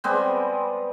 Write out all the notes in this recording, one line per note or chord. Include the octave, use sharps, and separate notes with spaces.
G3 G#3 B3 C4